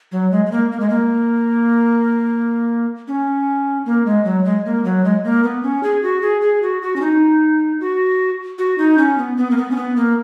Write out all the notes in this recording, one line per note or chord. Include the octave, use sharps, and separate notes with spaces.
F#3
G#3
G#3
A#3
A#3
G#3
A#3
C#4
A#3
G#3
F#3
G#3
A#3
F#3
G#3
A#3
B3
C#4
G#4
F#4
G#4
G#4
F#4
F#4
C#4
D#4
F#4
F#4
D#4
C#4
B3
B3
A#3
B3
C#4
B3
A#3